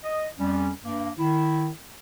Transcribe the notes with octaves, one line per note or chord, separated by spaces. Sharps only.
D#5
F2 G3 C#4
G2 A#3
D#3 E4